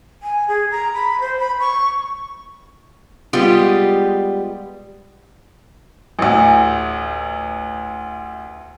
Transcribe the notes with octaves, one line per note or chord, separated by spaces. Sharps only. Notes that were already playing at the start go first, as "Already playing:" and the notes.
G#5
G#4
A#5
B5
C5
B5
C#6
G3 G#3 B3 F4 G4
A1 D2